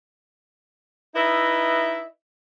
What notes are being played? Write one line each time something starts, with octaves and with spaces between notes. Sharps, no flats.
D#4 E4 B4 D#5 E5